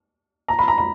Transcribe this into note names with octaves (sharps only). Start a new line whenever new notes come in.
A#5
B5
A#5
B5